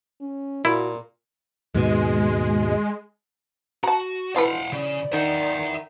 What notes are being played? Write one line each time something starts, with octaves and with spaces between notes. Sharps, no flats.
C#4
A#2 E4 F#4
D#2 G#2 B2 G#3
F#4 A5 A#5
D2 F3 E4 B4 C5 F5 F#5
C#3 D5
D#3 E5 F#5